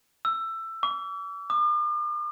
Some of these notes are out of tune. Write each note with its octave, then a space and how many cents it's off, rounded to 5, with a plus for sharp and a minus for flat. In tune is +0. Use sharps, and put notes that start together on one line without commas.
E6 +15
D6 -40
D6 +45